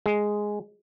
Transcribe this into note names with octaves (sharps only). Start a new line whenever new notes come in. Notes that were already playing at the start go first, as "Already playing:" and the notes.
G#3